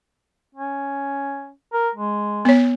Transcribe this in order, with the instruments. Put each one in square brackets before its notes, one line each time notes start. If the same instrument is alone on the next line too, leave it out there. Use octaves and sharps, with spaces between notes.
[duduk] C#4
A#4
G#3
[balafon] B3 C#5